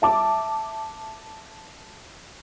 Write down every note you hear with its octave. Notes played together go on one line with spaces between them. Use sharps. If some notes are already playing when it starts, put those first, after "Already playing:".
E5 A5 D6